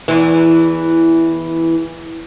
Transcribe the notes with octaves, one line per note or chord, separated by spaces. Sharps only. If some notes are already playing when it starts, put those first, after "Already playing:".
E2 E3